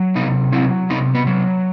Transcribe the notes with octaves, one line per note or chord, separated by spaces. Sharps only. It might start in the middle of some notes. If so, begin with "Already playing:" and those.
Already playing: F#3
C3 B3 D#4
F#3 C4 E4
C3 B3 D#4
B3
F#3